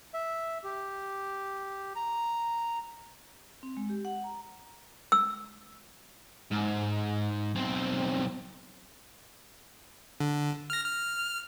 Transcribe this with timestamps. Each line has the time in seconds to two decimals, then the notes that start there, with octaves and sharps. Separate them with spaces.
0.14 E5
0.64 G4
1.96 A#5
3.63 C4
3.77 G#3
3.89 G4
4.05 F#5
4.24 A#5
5.12 E6
6.52 G#2
7.55 B1 C4
10.20 D3
10.70 F6 A#6
10.84 F6